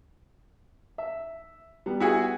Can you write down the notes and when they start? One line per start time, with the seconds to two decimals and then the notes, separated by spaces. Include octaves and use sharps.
0.98 E5
1.86 G3 B3
2.00 E4 F#4 G#4